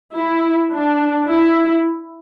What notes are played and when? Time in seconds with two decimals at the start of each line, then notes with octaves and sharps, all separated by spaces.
0.15 E4
0.73 D4
1.30 E4